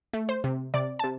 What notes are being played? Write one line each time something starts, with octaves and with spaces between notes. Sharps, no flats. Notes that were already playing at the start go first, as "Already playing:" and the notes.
A3
C5
C3
C3 D5
A5
C3